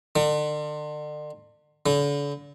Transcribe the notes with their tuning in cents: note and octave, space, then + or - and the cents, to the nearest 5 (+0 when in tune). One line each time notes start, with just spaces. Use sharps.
D3 +40
D3 -40